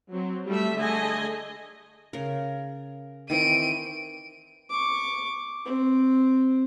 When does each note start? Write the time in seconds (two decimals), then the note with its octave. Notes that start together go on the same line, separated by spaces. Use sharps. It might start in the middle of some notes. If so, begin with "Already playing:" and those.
0.11 F#3 C4
0.48 G3 A3 E5
0.79 D3 A3 G#4 D#5 G#5
2.13 C#3 A#4
3.30 D#3 E3 C4 D7 D#7
4.70 C#6 D6
5.65 C4